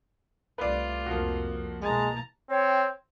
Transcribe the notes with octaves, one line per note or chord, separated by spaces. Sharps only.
C2 A3 F4 B4 D5
C2 F2 F3 A#3 F#4
B2 E3 G#3 A#3 A5 A#5
C4 C#5 G5